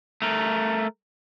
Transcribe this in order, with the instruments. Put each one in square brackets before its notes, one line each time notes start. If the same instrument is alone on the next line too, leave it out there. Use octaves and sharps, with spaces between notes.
[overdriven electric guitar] A3 A#4